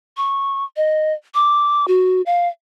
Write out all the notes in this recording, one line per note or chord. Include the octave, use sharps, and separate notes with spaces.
C#6
D#5
D6
F#4
F5